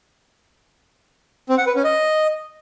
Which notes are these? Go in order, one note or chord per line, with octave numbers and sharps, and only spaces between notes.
C4
F#5
B4
C#4
D#5